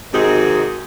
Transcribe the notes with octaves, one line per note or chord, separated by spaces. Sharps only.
G#2 C3 D#3 D#4 F#4 G#4